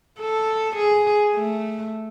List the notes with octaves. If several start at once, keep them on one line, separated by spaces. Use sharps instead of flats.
A4
G#4
A3